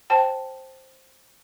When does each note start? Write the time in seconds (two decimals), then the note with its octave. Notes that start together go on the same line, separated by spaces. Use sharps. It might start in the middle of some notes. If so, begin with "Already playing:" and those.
0.10 C5 G5 A5